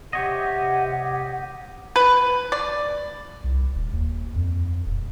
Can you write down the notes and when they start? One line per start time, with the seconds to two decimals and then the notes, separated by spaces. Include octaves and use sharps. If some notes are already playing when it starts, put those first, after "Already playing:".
0.13 C3 G4 C#5 D#5 F#5
1.96 B4
2.52 D5
3.44 C2
3.75 D#1
3.93 D#2
4.36 F2
4.86 D#1